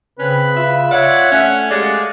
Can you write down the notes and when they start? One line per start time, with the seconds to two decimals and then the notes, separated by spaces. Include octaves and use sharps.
0.19 C#3 C4 C#4 B4
0.56 F4 E5
0.91 C#5 D5 E5 F#5
1.31 A3 C#4 F#5
1.71 G#3 G4 D5 F5 F#5